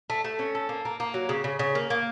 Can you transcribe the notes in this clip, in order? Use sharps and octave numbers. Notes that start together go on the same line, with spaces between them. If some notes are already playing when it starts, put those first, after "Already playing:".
A3
A3
C#4
A4
A#3
A#3
A#3
F#3
C#3
C#3
C#3
A#3
A#3